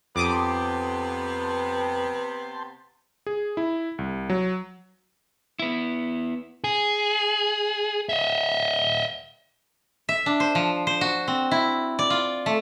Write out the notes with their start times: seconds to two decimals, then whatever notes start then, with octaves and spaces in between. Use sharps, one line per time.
0.16 F2 C3 B3 G5 A5 C6 D6 D#6
3.26 G#4
3.57 E4
3.99 C2
4.30 F#3
5.59 B3 E4
6.64 G#4
8.09 D#5 E5
10.09 E5
10.26 D4
10.40 C5
10.55 F3
10.87 C5
11.01 F#4
11.28 C4
11.51 E4
11.99 D5
12.10 F4
12.46 A3